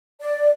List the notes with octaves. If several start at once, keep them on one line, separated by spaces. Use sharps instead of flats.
D5